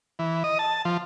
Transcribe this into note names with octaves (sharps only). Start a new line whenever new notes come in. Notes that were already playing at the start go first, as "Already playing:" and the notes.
E3
D#5
A5
F3